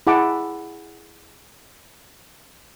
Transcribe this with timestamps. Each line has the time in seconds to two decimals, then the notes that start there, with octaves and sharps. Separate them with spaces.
0.07 E4 G#4 F#5 A5 D6